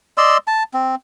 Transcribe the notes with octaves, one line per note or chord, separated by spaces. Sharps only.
D5 D#5 C6 E6
A5
C4